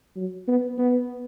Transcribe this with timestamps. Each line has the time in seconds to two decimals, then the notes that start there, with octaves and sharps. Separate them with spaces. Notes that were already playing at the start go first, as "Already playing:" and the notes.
0.17 F#3
0.48 B3
0.78 B3